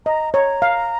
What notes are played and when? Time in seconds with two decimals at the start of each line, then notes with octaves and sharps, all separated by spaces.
0.06 D#5 A#5
0.34 C#5 A#5
0.62 F5